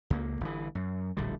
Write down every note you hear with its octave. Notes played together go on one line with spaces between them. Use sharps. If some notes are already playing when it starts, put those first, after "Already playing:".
C#2 A#3
G1 E3
F#2
D1 A#1 D3 G3